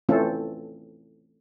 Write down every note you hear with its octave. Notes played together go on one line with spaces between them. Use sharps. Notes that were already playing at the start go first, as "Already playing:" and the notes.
E3 A3 C4 C#4 F4 A4